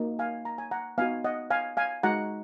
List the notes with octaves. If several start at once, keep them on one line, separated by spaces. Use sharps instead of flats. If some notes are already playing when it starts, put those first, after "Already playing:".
Already playing: A#3 D#4 F#4
F5 G#5
A#5
G#5
F#5 A#5
B3 D#4 F#4 F5 G#5
D#5 F#5
F5 G#5
F5 G#5
G#3 D#4 F#4 F#5 A#5